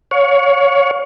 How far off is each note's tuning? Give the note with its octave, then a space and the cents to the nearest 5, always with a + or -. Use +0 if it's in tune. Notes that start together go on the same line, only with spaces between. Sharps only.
C#5 +15 F5 +35